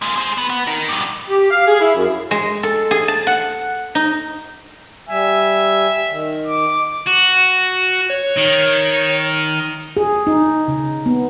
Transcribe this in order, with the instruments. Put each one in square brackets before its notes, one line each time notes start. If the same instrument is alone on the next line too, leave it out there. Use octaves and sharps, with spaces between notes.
[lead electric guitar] G#3 A#3
G#4 C5
B3
B3
D#4 A#4
G2 B2
[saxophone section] G4
F5
G#4
E4
F#2
[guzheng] G#3
A4
G#4
A5
F#5
D#4
[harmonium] G3 G#5 [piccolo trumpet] E5
[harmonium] D#3
[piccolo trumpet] D6
[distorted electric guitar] F#4
[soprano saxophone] C#5
[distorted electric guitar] D#3
[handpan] G#4
D#4
C#3
B3